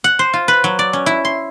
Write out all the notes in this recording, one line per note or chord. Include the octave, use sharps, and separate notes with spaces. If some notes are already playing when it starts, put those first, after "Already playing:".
F#5
C5
F4
B4
F#3
D5
C#4
E4
C6